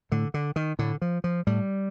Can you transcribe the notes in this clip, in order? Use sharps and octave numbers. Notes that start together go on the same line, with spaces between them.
A2 D3
D3
D#3
A2 D3
F3
F3
A2 G3